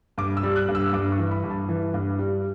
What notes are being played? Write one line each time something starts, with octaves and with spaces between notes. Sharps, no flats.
G2 D6
E6
G3
F#6
G2
E6
G2 D6
C#6
E3
B5
G2
A5
E3
G2
G3